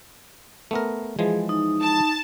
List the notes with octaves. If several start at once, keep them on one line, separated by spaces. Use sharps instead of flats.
A3 B3 A#4
E3 F3 G#3 G#4
D#4
A5